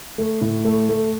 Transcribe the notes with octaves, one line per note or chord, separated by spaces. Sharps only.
A3
A2
A3
A3